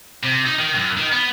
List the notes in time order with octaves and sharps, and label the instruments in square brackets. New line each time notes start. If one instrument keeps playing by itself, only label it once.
[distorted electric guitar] C3
D#4
D#3
F#2
D#3
B3